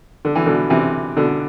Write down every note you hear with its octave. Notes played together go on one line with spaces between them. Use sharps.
D3
E3
B2 D3
C3 E3
B2 D3